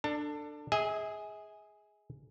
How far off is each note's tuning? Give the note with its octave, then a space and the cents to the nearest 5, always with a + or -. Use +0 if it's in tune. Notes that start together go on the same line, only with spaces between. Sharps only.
D4 +15 A4 +25 A5 +35
G#4 +0 E5 -45 G#5 -10